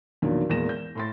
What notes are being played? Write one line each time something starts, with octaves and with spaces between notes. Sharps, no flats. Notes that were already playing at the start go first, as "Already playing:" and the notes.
E2 A#2 D3 D#3 F3 F#3
E2 A#2 G#3 A#6 E7
G6
A2 C6 A6